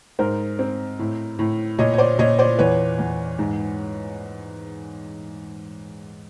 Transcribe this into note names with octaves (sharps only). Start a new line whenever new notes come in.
G#2 A#4 C5
C4
A2
A2
A#2 C#5 D#5
C#5
C5 D5
A#2 C#5 D#5
C5 D5
E2 B4 C#5
E2
G#2